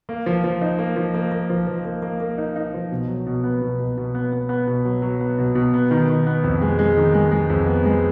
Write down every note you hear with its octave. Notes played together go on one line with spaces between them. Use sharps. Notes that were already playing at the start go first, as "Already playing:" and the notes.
A#3
F3
F3
D#4
A#3
F3
A#3
A#3
F3
F3
A#3
A#3
A#3
D#4
D#4
F3
B2
F#3
B2
B3
B2
B2
B2
B3
B3
B3
B2
F#3
F#3
B3
B2
B2
B3
D#3
D#3
B3
F2
G#3
G#3
D#3
G#3
G#3
F2
B3
G#3